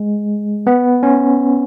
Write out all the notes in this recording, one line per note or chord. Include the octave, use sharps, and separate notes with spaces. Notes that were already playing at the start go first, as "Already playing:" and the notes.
Already playing: G#3
B3
C#4